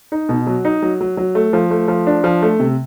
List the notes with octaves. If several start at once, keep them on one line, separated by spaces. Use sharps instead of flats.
D#4
B2
F#3
D#4
F#3
F#3
F#3
A3
F3
A3
F3
D4
F3
A3
C3